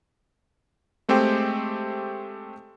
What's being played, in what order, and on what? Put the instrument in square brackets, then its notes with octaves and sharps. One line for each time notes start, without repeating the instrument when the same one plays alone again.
[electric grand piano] G#3 A3 C4 G4 C5 G5